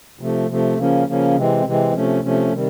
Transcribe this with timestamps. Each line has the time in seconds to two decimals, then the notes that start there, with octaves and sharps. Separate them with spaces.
0.19 C3 F3 A3
0.48 C3 F3 A3
0.78 C#3 F3 A#3 C#4
1.08 C#3 F3 A#3 C#4
1.36 C3 E3 G#3 C4
1.65 C3 E3 G#3 C4
1.94 C3 F3 A3 C#4
2.23 C3 F3 A3 C#4
2.52 C3 D#3 G3